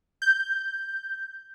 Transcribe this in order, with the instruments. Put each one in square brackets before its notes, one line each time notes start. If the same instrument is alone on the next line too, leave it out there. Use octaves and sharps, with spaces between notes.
[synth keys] G6